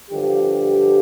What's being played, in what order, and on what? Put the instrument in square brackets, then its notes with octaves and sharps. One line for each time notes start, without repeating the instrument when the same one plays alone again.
[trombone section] G2 D3 F3 G4